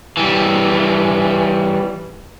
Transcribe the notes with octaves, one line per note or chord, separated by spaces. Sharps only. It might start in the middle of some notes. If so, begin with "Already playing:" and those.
E3 G3